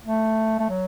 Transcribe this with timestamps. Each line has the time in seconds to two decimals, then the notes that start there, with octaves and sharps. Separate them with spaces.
0.05 A3
0.59 A3
0.70 F#3